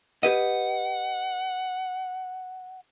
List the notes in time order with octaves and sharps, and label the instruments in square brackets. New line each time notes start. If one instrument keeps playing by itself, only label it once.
[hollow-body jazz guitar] G4 B4 D#5 [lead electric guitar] F#5